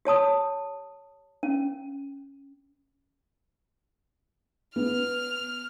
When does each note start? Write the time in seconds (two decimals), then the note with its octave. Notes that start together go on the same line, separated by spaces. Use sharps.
0.05 G4 C#5 A5 D#6
1.43 C#4
4.76 B3 F6 F7